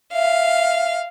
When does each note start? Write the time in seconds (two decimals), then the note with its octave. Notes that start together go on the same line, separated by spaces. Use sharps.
0.14 E5 F5